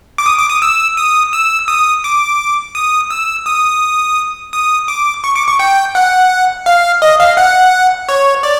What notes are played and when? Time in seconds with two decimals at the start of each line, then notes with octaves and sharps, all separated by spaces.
0.18 D6
0.26 D#6
0.38 D6
0.50 D#6
0.62 E6
0.97 D#6
1.33 E6
1.68 D#6
2.04 D6
2.75 D#6
3.10 E6
3.46 D#6
4.53 D#6
4.88 D6
5.24 C#6
5.36 D6
5.48 C#6
5.59 G5
5.95 F#5
6.66 F5
7.02 D#5
7.20 F5
7.37 F#5
8.09 C#5
8.43 D5